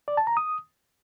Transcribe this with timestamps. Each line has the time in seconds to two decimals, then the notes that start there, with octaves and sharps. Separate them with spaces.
0.08 D5
0.17 A5
0.27 A#5
0.37 D#6